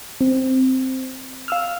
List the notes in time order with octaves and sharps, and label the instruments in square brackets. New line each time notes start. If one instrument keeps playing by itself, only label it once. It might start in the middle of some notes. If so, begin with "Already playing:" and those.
[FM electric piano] C4
F5 E6 F6